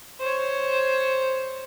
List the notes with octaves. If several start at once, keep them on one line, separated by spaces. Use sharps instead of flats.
C5 C#5